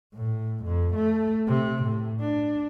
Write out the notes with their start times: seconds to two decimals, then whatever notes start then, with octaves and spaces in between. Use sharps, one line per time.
0.14 A2
0.64 F2
0.95 A3
1.47 C3
1.83 A2
2.20 D4